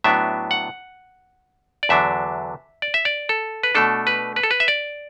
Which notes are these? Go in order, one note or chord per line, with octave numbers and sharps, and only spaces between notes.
A2 F#3 B3 D4 E5
F#5
D5
E2 D3 F#3 D4 E5
D5
E5
D5
A4
B4
B2 A3 D4 A4
B4
B4
A4
B4
E5
D5